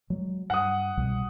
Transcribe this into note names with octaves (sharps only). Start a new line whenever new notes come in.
F#3 G#3
G2 F#5 D#6
C2 B2 G3